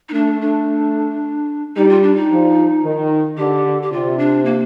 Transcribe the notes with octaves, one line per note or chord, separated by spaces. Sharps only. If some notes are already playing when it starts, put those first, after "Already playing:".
D#4
A3 D4
D4
G3 D#4
F4
D4
D#4
F3
D#3
D3 G4
G4
C3 F4
D4
A#3